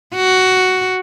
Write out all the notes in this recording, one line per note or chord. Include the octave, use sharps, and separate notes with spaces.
F#4